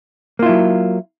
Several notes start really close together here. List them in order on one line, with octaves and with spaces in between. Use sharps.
A#3 F4 E4 F#3